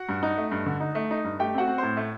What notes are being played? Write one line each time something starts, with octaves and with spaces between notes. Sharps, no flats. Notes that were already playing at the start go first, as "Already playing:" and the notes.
Already playing: F#4 F#5
G2
D#4
A3
G2
D3
D#4
A3
D#4
G2
A3 G4 G5
C4 F#4 F#5
C4
A2 C5
A3